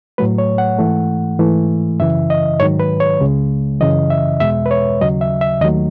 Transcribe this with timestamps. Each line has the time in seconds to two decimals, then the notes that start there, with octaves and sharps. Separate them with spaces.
0.18 A2 F#3 A3 B4
0.38 C#5
0.58 F#5
0.79 G#2 E3 A3
1.39 G#2 E3 A3
2.00 F#2 C#3 E3 E5
2.30 D#5
2.60 G#2 D#3 F#3 C#5
2.80 B4
3.00 C#5
3.20 C#2 C#3 G#3
3.80 F#2 C#3 E3 D#5
4.10 E5
4.40 E2 B2 G#3 E5
4.66 B4
4.71 C#5
5.01 D#2 C#3 F#3 D#5
5.21 E5
5.41 E5
5.61 D#2 D#3 F#3 A3 D#5